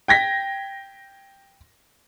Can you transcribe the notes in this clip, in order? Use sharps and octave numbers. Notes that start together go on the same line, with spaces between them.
G5 G#6 A#6 B6